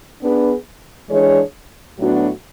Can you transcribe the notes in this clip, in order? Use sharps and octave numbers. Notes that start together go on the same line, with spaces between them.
B3 D4 G#4 B4
E3 G#3 D4 G#4 C#5
A2 F#3 B3 D4 F#4